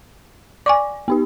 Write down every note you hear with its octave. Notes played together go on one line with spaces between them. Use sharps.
D5 G#5 C#6 D6
B3 D#4 G4